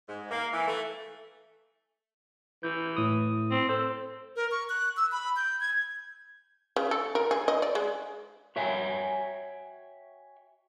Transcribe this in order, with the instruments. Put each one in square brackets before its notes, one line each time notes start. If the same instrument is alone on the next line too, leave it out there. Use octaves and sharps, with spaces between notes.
[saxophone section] G#2
A#3
E3
A3
[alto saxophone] E3 [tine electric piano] G6
[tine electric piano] A2 D#6
[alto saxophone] C4
[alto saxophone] A4 [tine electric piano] C5
[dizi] A#4
C#6
F#6
E6
B5
G6
G#6
[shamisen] C#3
A4
A#4
G#4
D#5
D5
G#3
[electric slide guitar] F#4 C#5 E5 G5 G#5